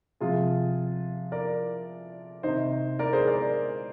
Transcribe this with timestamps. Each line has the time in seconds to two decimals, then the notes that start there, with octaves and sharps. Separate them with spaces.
0.21 C3 F3 F4 G#4
1.32 A#4 D5
2.43 C3 D#3 C5 D#5
2.99 A#4 D5
3.13 G#4 C5
3.27 A#4 D5